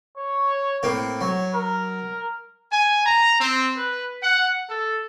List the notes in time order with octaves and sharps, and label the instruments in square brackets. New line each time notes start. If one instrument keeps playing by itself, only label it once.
[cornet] C#5
[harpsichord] A2 A#3 C4
[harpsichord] F#3 [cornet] C#5
[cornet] A#4
[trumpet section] G#5
A#5
C4
B4
F#5
A4